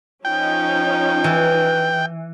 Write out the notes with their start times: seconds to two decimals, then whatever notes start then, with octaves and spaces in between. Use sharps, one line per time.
0.25 F3 C#4 D#4 G5
1.24 E3